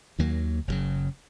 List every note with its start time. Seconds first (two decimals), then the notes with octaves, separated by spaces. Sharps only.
0.19 D#2 D#3 F#3 A#3
0.68 F#1 F2 C#3 F#3